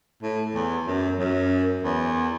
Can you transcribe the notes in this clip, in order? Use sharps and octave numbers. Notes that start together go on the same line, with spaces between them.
A2
E2
F#2
F#2
E2